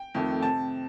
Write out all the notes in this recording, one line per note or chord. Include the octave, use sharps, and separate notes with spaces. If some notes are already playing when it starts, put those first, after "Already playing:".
Already playing: G5
F2 D#3 A3
C3 A5